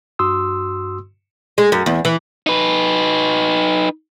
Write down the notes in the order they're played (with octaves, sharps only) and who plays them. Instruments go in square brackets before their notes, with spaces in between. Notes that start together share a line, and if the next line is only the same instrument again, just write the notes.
[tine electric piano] G2 F#4 C6 D#6 E6
[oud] G#3
F#2
E2
E3
[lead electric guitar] D#4 B4